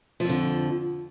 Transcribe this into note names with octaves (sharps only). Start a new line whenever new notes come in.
F2 D3 F3